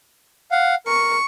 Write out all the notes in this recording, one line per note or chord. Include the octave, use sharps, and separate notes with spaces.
F5 F#5
A#4 C#6